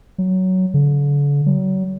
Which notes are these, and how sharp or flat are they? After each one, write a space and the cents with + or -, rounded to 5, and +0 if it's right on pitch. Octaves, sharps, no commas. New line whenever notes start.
F#3 +10
D3 -40
F#3 +35